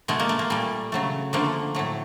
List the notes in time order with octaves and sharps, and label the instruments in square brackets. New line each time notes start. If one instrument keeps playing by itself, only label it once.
[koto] B2 G#3 A3
A#3
A3
A#3
A#2 G3 A3
C#3 F#3 A3
D3 F3 A3 A#3
A2 F#3 A3